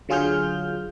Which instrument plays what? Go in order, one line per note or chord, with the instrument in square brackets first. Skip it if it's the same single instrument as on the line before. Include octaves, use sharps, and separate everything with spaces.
[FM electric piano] D3 F#3 F4 G#4 F6 G6